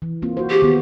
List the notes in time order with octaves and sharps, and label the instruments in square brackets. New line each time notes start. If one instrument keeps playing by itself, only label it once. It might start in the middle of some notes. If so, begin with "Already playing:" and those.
[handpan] E3
A#3 C4 F4
F#4 C5
[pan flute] G4 [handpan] G#4
[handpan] D#3 B3